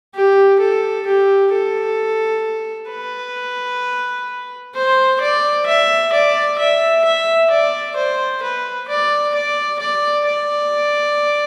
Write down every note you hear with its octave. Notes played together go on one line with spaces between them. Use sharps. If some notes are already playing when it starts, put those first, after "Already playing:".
G4
A4
G4
A4
B4
C5
D5
E5
D5
E5
E5
D5
C5
B4
D5
D5
D5
D5